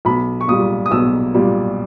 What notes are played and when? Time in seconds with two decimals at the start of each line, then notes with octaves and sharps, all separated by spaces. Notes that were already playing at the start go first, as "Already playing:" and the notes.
0.05 B1 B5
0.41 C#6
0.48 A#2 G3 D#6
0.86 D#6
0.91 B1 E6
1.34 A#2 G3